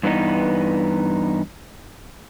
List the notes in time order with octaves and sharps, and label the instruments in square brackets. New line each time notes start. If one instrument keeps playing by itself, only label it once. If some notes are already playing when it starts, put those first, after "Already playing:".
[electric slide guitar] G2 E3 B3 D#4